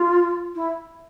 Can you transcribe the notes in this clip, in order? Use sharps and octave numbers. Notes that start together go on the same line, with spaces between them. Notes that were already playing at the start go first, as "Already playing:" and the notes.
Already playing: F4
E4